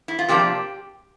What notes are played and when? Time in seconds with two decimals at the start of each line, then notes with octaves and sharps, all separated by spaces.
0.08 E4
0.19 F4
0.29 C3 F3 A#3 D4 G4